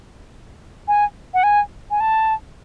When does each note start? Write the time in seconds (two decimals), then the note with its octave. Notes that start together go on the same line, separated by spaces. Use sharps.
0.88 G#5
1.34 F#5
1.43 G#5
1.91 G#5
2.00 A5